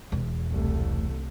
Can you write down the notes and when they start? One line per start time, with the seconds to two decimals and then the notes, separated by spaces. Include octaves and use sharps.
0.12 E1 E2
0.51 C2 A3